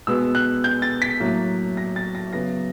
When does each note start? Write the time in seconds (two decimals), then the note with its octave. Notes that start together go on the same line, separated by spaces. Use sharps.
0.07 B2 G#3 B3 E6
0.35 F#6
0.64 G6
0.82 A6
1.02 B6
1.20 A2 F#3 A#3
1.77 A#6
1.96 A6
2.15 A#6
2.33 C#3 F#3 B3 A#6